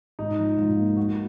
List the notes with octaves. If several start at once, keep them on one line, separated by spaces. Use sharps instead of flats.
G#2 D#4
F3
G#2 F4
A#3
A#3 F#4